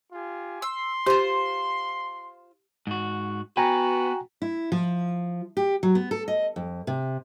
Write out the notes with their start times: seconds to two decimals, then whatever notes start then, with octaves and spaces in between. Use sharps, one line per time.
0.12 F4 G4 G#5
0.62 C6 E6
1.06 F4 G4 C5
2.87 G#2 F#4
3.57 B3 F#4 B4 G5 G#5 A#5
4.42 E4
4.72 F3
5.57 G4
5.83 F#3
5.95 B3
6.11 A4
6.28 D#5
6.56 F2
6.87 C3